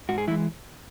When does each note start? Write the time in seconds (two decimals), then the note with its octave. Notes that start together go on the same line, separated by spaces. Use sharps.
0.09 G#2 F#4
0.18 G#4
0.27 E3 E4
0.31 G#3